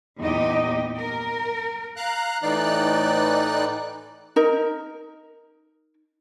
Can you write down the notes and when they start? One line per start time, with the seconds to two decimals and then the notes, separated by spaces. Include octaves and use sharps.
0.21 E2 A#2 D#4 G4 D#5
0.96 A#4
1.96 F5 A#5 F#6
2.43 A2 E3 D#4 D5 F#6
4.36 D#4 A#4